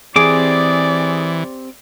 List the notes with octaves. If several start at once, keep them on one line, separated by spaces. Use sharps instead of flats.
E3 C4 G4 G#4 D5 D6